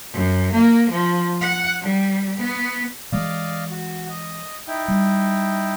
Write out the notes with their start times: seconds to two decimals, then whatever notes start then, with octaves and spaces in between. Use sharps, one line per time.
0.12 F#2
0.53 A#3
0.90 F3
1.41 F#5
1.81 G3
2.37 B3
3.12 E3 G#3 D5 D#5 F5
3.71 F#4
4.10 D#5
4.67 D#4 E4 G5
4.88 G3